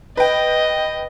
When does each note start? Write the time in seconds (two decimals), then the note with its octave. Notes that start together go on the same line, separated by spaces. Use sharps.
0.17 B4 D#5 G5